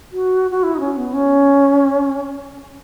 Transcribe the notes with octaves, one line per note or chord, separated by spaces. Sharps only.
F#4
F#4
E4
D#4
C#4
B3
C#4